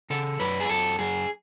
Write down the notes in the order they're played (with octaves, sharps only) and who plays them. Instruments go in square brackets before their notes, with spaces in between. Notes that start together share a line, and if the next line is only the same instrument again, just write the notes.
[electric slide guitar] C#3 A4
F#2 B4
G#4
F#2 A4
F#2 G#4